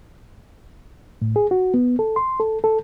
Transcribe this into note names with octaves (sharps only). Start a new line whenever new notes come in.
A2
G#4
F#4
B3
A4
C6
A4
A4